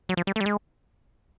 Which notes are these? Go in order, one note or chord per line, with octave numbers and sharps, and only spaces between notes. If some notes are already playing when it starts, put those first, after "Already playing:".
F#3
F3
G3
A3
G3
G#3